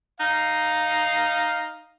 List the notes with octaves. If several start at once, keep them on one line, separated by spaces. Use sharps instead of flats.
D#4 F5